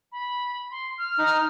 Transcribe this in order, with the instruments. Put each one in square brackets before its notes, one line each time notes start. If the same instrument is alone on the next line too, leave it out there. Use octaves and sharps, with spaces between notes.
[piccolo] B5
C6
F6
[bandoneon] D#4